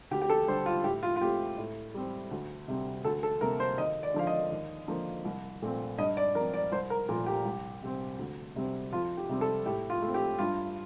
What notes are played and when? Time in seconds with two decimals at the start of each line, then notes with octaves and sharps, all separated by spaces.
0.11 D2 G4
0.21 G4
0.30 A4
0.48 D3 G3 C5
0.66 F4
0.84 A2 G4
1.03 F4
1.16 F4
1.21 C4 G4
1.25 A3
1.58 A2
1.94 G3 C4
2.31 D2
2.68 C3 G3 C4
3.04 D2 A4
3.23 A4
3.41 C3 G3 A#3 A#4
3.60 C5
3.78 D#2 D#5
4.03 D5
4.14 D3 F3 F5
4.27 D#5
4.52 D#2
4.88 D3 F3 A#3
5.25 C2
5.62 A#2 A3 C4
5.98 G2 D#5
6.17 D5
6.35 F3 A#4
6.39 C4
6.54 D5
6.72 C2 C5
6.90 A#4
7.08 A#2 F3 A3 F4
7.26 G4
7.45 C2
7.82 C3 G3 C4
8.19 D2
8.56 C3 G3 C4
8.92 F2 F4
9.17 G4
9.29 C3 G3 C4
9.41 A4
9.66 A2 G4
9.90 F4
10.02 A3 C4
10.14 G4
10.39 G2 F4